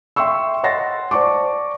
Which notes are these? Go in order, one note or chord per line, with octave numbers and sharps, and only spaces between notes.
E5 G5 C6 C#6 E6
C#5 D#5 F#5 C6 A6 A#6
C5 D5 A5 C#6 D6